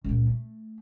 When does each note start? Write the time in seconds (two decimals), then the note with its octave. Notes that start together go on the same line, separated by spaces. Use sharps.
0.04 C#2 A#2
0.30 A3